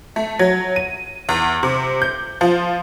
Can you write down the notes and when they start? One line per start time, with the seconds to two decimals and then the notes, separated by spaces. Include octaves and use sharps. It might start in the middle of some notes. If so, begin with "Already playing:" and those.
0.16 A3
0.39 F#3
0.76 D#7
1.29 E2
1.63 C3
2.02 G6
2.41 F3